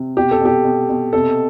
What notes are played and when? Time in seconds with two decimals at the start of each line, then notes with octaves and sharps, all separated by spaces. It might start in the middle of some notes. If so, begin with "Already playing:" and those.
Already playing: C3
0.17 B2 G4
0.31 A4
0.41 B2 G4
0.64 B2
0.89 B2
1.13 C3 A4